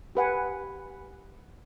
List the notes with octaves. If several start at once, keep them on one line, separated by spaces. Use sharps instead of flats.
G4 B4 F#5 G#5